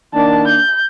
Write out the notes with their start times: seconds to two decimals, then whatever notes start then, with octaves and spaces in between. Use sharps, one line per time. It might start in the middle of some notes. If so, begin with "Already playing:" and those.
0.14 D#3 A#3 D4 A5
0.47 G6